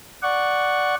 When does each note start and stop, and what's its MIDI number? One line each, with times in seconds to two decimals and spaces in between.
0.23 0.95 74
0.23 0.95 78
0.23 0.95 85